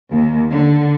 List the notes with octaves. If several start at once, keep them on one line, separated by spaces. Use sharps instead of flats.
D#2
D3